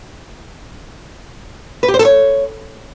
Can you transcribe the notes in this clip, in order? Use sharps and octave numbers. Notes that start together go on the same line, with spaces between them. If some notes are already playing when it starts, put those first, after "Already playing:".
B4
G4
C5
A4
C#5